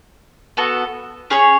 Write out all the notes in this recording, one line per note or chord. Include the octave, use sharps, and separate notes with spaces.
B3 F#4 A4
C#4 G#4 C#5